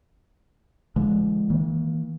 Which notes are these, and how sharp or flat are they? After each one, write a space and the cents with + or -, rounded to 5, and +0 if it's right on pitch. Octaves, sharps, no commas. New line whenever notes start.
D3 +0 F3 -40 G#3 +0
E3 -45 A#3 +0